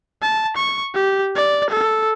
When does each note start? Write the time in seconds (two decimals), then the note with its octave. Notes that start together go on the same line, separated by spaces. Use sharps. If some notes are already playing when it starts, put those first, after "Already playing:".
0.22 A5
0.56 C#6
0.95 G4
1.36 D5
1.70 A4